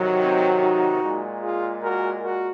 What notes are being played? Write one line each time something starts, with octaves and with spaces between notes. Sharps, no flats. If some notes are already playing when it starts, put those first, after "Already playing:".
Already playing: C3 D#3 F#3
C4 D#4
D#4 F#4
A#2 G#3
F4 G#4
F#4 A#4
F#4 A#4